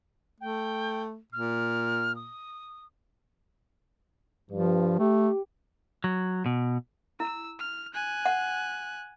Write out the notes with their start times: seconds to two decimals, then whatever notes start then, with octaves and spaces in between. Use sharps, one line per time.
0.41 A3 G5
1.32 A#2 F6
2.15 D#6
4.51 G2 F3
4.99 A3 G4
6.04 F#3
6.46 B2
7.20 E4 E6
7.59 F6
7.94 G#5 F#6
8.25 F#5